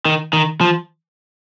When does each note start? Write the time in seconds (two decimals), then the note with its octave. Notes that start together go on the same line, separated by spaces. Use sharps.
0.05 D#3
0.33 D#3
0.61 F3